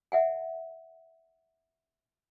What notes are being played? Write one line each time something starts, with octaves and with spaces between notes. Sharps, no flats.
E5 F#5 G#5